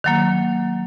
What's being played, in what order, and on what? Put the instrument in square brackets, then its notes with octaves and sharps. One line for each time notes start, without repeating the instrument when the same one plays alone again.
[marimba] D#3 F#3 A#3